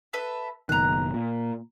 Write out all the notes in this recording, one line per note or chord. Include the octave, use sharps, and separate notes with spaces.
A4 B4 E5
F#1 B2 D#3 A#5 F#6
A#2